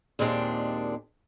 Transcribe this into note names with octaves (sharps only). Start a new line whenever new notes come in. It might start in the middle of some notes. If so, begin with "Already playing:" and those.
D#2 A#2 G#3 B3 C4 D4